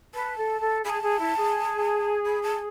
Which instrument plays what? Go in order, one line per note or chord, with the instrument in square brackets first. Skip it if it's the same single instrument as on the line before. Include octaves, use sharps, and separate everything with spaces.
[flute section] B4 [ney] A5
[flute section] A4
A4
[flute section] G#4 [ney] B5
[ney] A5
[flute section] G#4
E4
G#4
[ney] B5
A5